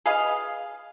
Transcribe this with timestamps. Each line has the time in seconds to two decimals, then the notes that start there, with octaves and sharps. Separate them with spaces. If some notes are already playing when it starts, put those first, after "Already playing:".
0.06 G#4 B4 D#5 F5